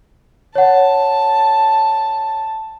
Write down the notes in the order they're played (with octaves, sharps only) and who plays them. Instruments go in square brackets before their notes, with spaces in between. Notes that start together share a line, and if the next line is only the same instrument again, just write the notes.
[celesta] C#5 F#5 [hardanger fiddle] A5